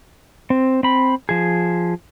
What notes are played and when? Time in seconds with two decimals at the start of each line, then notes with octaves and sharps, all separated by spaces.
0.50 C4
0.83 C4 B5
1.29 F3 G#4